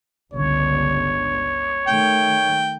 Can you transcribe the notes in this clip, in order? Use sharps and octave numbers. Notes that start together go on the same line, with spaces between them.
G1 C#2 D3 C#5
D#3 A3 G5